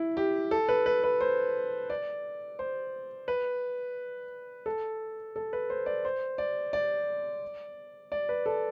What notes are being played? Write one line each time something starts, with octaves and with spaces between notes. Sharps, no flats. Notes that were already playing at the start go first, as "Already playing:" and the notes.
Already playing: E4
G4
A4
B4
B4
B4
C5
D5
C5
B4
A4
A4
B4
C5
D5
C5
D5
D5
D5
B4
A4